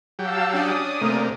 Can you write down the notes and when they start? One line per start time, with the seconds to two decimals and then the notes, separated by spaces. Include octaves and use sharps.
0.19 F#3 G4 F5 A5 E6
0.53 C#4 D4 D5 D#6
1.01 C3 A3 A#3